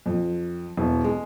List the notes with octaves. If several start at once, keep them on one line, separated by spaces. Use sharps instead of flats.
F2
E1
G#3